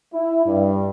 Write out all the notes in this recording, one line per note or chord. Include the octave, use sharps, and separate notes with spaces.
E4
G2